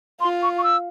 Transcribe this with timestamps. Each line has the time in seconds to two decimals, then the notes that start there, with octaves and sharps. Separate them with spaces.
0.21 F4 C6
0.42 C#6
0.58 C#6
0.63 E6